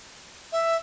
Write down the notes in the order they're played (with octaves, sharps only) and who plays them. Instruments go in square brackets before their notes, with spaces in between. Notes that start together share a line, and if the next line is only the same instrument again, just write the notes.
[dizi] E5